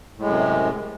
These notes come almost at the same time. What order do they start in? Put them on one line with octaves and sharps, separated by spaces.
A2 G#3 F#2 C3